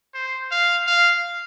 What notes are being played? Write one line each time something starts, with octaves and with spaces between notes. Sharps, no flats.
C5
F5
F5